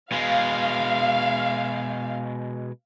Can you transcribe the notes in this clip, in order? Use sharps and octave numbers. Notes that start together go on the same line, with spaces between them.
B2 G#3 F5